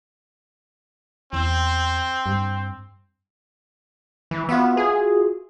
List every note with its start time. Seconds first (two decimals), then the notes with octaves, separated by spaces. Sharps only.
1.33 E2 C4
2.26 G2
4.31 E3
4.49 B3 F4 F#4 E5
4.77 G#4